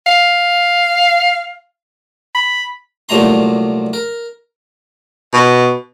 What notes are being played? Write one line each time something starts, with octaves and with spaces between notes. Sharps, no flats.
F5
B5
C2 A#2 F#3 A3 A#5 C6
A#4
B2